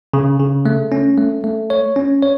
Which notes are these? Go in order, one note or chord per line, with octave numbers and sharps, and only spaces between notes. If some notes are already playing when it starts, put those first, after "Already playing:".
C#3
C#3
A3
C#4
A3
A3
C#5
C#4
C#5